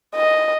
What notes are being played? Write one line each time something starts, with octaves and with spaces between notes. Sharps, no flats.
D#5